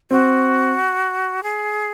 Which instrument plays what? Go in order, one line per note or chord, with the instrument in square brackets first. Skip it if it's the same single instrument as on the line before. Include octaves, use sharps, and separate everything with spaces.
[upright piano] C4 [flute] F#4
[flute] G#4